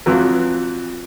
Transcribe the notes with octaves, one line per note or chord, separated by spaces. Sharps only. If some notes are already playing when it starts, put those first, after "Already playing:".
F2 E3 F#3